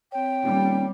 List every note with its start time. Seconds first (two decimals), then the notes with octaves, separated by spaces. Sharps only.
0.12 C4 C#5 G5
0.44 D#1 G3